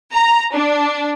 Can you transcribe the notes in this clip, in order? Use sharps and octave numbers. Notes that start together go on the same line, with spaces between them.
A#5
D4